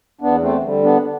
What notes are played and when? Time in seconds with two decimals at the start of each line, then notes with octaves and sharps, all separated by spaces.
0.21 E2 B3 D4
0.42 A3 C4
0.63 D3 G3
0.83 B3 D4